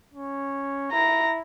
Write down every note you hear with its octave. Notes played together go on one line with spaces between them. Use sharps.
C#4
E4 A#5